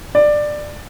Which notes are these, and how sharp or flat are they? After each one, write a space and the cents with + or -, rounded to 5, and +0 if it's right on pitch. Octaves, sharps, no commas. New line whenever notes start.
D5 +15